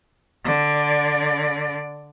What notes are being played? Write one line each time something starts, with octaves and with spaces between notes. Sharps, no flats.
D3 D5